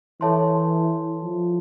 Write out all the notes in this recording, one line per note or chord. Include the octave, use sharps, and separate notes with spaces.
E3 A4 C#5 E5 A5 C6
F3